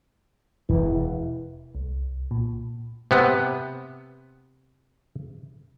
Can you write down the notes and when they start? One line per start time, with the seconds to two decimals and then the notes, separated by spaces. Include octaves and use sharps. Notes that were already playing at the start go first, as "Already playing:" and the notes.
0.69 E1 E3
1.75 C2
2.31 A#2
3.11 C3 B3